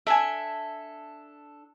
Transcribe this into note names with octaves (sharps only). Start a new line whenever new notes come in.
D4 A4 E5 G#5